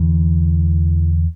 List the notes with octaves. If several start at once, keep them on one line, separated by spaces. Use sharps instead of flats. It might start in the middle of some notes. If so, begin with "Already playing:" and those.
Already playing: E2 D3 E3